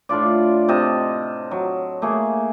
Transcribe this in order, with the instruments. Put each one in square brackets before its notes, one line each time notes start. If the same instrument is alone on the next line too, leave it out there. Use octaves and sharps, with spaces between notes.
[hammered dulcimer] A2 D4 F4 D5
C3 A4 D#5 A5
F#3
A3 A#3 G#4